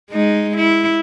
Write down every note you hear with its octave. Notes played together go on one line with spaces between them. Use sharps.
G#3 D#4
E4